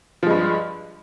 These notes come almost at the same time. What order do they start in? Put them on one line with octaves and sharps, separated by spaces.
F3 G#3 G2